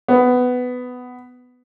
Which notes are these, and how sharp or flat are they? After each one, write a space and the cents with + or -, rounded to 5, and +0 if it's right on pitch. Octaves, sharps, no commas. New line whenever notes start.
B3 +15